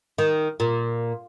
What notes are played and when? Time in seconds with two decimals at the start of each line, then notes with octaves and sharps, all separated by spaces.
0.18 D#3
0.60 A#2